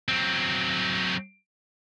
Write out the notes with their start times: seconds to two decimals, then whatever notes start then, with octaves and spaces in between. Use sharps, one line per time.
0.09 F#3 C4